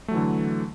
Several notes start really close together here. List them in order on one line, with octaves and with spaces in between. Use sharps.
A3 F#3 E3 D3